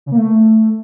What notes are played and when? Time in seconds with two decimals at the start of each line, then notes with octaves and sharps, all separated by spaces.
0.06 C#3
0.12 A#3
0.18 A3